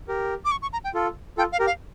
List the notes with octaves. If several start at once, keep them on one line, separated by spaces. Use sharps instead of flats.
G4 A#4
D6
C#6
C#6
A#5
G5
F4 A4
F4 A4 G5
F5
G4 A#4
F5